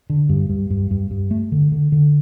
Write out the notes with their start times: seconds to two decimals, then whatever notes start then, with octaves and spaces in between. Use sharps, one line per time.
0.10 D3
0.29 G2
0.50 G2
0.70 G2
0.91 G2
1.11 G2
1.31 A3
1.52 D3
1.72 D3
1.92 D3